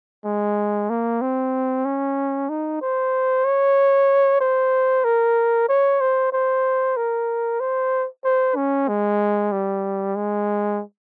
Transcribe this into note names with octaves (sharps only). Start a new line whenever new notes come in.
G#3
A#3
C4
C#4
D#4
C5
C#5
C5
A#4
C#5
C5
C5
A#4
C5
C5
C#4
G#3
G3
G#3